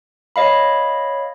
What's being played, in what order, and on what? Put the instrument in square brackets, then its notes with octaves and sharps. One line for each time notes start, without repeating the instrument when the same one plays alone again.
[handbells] C#5 D#5 F5 B5